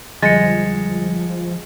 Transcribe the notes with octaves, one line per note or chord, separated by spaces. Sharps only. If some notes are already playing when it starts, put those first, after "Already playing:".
F2 D3 F3 G3 G#3 A6 C#7